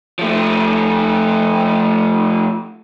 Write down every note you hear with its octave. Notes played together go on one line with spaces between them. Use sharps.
F3 A3